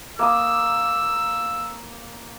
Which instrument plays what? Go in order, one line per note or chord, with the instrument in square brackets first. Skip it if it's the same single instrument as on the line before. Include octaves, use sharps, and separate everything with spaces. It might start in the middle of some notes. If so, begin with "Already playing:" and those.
[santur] A#3 D#6 [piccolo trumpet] E6